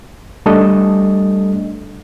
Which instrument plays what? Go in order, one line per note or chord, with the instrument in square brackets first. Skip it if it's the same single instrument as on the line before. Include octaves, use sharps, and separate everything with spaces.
[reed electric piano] G3 A3 D4 A4 D#5